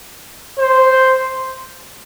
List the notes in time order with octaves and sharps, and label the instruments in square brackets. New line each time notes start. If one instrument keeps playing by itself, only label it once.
[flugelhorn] C5